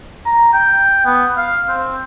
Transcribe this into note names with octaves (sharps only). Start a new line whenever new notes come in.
A#5
G5
B3
F5
C4